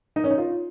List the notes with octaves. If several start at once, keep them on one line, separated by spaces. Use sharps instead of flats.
D#4
C#4
D#4
F4